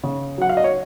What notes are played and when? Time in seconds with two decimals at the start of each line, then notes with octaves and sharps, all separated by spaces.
0.04 C#3
0.38 F#3 F#5
0.49 F5
0.57 D#5
0.64 C#5